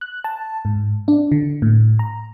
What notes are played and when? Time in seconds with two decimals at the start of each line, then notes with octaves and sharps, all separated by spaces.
0.01 F#6
0.24 A5
0.65 G#2
1.08 D4
1.32 D3
1.62 A2
1.99 A#5